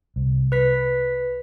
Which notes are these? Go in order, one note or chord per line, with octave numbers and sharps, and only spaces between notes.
C2
B4 B6